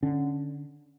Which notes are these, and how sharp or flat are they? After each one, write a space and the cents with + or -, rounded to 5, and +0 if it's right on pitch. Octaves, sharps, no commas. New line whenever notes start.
D3 +0 C#4 +5